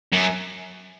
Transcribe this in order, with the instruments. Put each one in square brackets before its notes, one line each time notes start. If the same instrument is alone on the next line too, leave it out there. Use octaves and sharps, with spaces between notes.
[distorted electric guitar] F#2